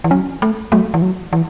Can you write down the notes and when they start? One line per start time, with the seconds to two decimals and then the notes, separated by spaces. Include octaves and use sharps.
0.04 E3
0.11 F#3 C#4
0.42 A3
0.72 F#3 A3
0.94 E3
1.02 F#3
1.33 E3